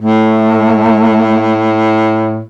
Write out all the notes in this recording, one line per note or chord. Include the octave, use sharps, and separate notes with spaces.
A2 A3